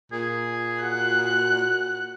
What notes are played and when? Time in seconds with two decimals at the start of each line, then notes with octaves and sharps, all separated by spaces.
0.12 A#2 G#4
0.83 F#4 F#5 F#6